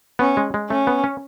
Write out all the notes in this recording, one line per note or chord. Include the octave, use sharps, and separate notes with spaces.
B3 C#4
G#3
G#3
A3 C#4
B3
C#4